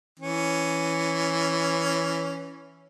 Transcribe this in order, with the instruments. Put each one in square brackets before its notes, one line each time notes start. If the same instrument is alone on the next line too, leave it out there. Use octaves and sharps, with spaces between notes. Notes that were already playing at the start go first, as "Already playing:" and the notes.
[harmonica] E3 C#4